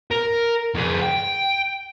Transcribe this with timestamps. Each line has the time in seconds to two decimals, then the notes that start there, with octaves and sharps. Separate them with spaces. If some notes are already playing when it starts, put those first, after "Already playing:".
0.11 A#4
0.75 F2 G#4
1.02 G5